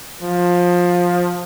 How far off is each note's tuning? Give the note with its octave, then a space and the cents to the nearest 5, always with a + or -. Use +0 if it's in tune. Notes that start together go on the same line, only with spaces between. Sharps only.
F3 +15